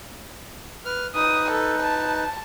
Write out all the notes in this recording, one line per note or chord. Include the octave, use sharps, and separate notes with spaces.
B4 F6
D#4 B4 D#6
A4
A5